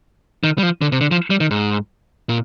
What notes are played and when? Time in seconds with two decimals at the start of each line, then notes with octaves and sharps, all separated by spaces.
0.44 D#3
0.58 G3
0.63 F3
0.82 D3
0.92 C3
1.01 D3
1.11 F3
1.30 G3
1.40 D#3
1.51 G#2
2.29 A#2